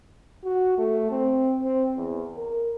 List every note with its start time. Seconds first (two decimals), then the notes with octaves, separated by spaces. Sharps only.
0.44 F#4
0.78 A3
1.11 C4
1.64 C4
1.97 E2
2.37 A#4